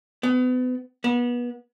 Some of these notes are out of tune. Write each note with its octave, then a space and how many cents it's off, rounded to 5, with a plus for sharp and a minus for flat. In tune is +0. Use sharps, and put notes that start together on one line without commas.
B3 +35
B3 -30